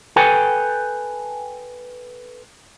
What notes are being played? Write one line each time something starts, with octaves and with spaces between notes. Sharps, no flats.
A4 B4 G5 G#5